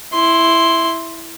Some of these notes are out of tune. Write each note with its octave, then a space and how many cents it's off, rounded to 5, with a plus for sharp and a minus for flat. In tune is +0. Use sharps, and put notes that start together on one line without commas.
E4 +0 C6 +0